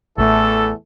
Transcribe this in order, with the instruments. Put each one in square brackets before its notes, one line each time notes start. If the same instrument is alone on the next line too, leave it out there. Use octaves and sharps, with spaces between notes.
[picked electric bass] A1 A2 [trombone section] E2 A3 [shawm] A4